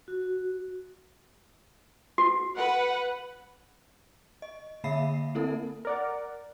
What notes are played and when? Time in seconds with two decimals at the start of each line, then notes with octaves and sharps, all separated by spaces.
0.08 F#4
2.18 F#4
2.56 B4 F#5
4.42 D#5
4.84 D3 A#3 E5 F5 B5 C7
5.35 A#3 C4 E4 A4 A#4
5.85 A#4 D5 F#5